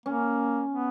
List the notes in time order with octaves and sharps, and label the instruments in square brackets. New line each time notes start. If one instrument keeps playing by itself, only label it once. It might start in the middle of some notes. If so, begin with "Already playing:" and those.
[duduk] A#3 [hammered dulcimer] C#4
[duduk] B3